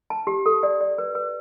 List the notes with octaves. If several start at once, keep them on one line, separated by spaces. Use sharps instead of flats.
A5
G4
A4
D5
D5
B4
B4